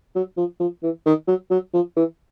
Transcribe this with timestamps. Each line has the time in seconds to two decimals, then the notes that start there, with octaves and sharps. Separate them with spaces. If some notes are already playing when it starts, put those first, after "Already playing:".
0.15 F#3
0.37 F3
0.60 F3
0.83 E3
1.06 D#3
1.28 F#3
1.51 F#3
1.73 F3
1.96 E3